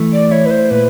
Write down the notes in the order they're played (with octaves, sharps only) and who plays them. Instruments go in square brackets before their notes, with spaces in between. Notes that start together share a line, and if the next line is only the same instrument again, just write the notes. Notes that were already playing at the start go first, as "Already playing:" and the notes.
Already playing: [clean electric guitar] E3 A3
[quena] D5
[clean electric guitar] E4 [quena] C#5
[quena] B4
C5
[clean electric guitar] A#2 [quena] B4